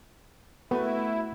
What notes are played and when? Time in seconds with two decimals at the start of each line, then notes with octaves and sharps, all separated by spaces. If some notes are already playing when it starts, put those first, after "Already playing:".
0.71 A3 B3 E4 F#4 B4